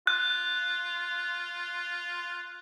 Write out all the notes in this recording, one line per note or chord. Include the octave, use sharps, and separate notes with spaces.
F4 F#6